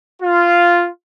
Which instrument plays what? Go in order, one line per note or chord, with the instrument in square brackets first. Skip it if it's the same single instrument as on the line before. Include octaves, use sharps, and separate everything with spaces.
[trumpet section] F4